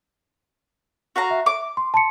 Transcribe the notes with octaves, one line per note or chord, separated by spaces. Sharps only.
F#4 F5 A#5
E5
D6
C6
A5 C6 C#7